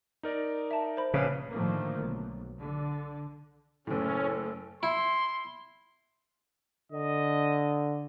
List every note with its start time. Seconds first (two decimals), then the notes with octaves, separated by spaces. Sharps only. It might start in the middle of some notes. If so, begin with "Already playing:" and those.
0.23 D#4 A#4 D5
0.71 E5 A5
0.97 C5 B5
1.14 A#1 C#3 B4
1.51 A2 D3 D#3 F3 A3 A#3
1.98 B1
2.60 D3
3.87 F#1 A2 C#4 A4
4.83 E4 C6
6.92 D3 D#5